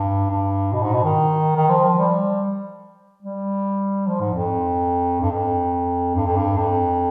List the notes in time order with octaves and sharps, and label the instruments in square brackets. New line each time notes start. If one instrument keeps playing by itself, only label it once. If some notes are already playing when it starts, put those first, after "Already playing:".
Already playing: [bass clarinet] G2
G2
B2
G#2
B2
D#3
D#3
F3
F3
G3
G3
F3
G#2
F2
G2
F2
G2
F2
G2
F2